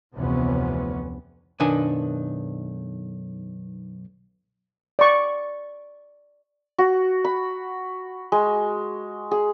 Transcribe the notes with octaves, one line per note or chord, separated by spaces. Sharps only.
F1 D2 C3 E3 B3 C#4
B1 F#2 D#3 D4 G#5
D5 C#6
F#4
B5
G#3
G#4